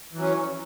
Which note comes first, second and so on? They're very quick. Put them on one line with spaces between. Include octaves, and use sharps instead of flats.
E3 F#3 C#4